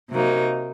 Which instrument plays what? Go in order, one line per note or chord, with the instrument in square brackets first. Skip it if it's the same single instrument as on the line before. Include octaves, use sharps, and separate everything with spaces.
[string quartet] C3 F#3 A#3 D#4